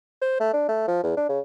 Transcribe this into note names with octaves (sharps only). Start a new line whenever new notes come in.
C5
A3
D4
A3
F3
E2
D4
C#3